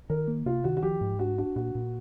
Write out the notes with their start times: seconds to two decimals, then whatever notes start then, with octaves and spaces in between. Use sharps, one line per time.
0.10 D#3 A#4
0.28 A#3
0.46 C3 F4
0.64 D#3 F#4
0.77 F#4
0.83 F3 G4
1.01 G#2
1.19 D4 F#4
1.38 D4 F#4
1.56 A#2 F#4
1.75 A#2